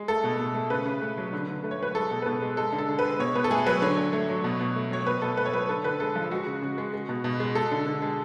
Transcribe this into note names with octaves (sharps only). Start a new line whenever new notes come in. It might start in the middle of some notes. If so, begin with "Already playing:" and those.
Already playing: G#3
A3 A4
B2
B2
A3
C#3 B4
C#3
A3
F#3
D3
D3
A3
C#5
F#3 B4
G#3 A4
B2
B4
B2 A4
G#3
G#3 A4
D3
A4
D3
B4
G#3
B2 C#5
B2 B4
A4
A3 G#4
F#3 B4
D3 C#5
D3
A3
F#3
B2
B2
A3
F#3 C#5
B2 B4
B2 A4
A3 B4
C#5
F#3 B4
D3 A4
D3 B4
G#3 A4
F3
G#3 F#4
C#3
C#3
G#3
G#3
B2
B2
G#3
G#3 A4
D3
D3
G#3